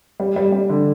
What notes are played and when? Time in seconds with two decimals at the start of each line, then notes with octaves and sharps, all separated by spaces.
0.20 G3
0.36 G3
0.52 G3
0.70 D3